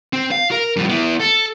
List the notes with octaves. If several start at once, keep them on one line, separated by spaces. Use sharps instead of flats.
C4
F5
A#4
G2 F3
B3 E4
A4